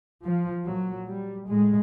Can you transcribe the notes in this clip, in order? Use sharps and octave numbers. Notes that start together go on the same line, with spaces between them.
F3
A#2 F#3
G3
A2 G#3